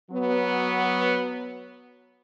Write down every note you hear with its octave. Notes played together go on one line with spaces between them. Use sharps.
F#3 B3